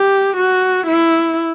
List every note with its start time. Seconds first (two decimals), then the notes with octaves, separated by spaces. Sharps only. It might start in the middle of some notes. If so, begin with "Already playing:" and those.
Already playing: G4
0.37 F#4
0.86 E4